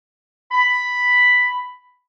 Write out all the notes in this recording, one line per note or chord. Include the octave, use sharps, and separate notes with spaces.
B5